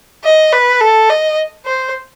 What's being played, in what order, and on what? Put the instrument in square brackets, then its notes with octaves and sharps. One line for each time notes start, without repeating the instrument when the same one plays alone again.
[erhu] D#5
B4
A4
D#5
C5